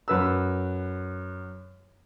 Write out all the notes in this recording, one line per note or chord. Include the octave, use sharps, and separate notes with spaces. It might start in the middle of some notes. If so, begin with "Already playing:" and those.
F#2 B4 E6